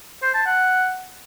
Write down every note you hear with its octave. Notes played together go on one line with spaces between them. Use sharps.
C5
A5
F#5